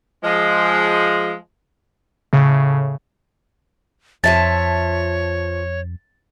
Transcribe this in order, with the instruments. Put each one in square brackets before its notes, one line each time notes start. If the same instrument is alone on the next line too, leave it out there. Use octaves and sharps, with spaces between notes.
[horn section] F3 G#3
[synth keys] A2 C#3
[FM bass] F2 [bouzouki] F3 E5 A5 [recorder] C#5 [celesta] A6